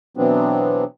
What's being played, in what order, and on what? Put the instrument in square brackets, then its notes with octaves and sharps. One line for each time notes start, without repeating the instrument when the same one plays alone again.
[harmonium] B2 E3 F#3 B3 C4 D4